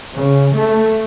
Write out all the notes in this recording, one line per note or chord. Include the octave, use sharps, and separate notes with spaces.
C#3
A3